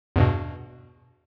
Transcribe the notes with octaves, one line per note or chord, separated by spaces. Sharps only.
E2 G2 B2